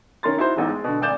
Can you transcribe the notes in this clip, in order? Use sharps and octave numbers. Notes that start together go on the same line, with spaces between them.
D#3 C#4 A#4 C6 A6
D#4 E4 F#4 C5
E1 A1 D#4
G#3
B2 D3
G#1 D2 D5 G6 E7